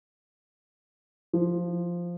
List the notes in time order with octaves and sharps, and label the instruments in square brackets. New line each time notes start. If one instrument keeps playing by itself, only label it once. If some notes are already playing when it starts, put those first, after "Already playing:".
[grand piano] F3